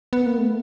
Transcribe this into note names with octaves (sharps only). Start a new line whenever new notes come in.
B3
A#3
A3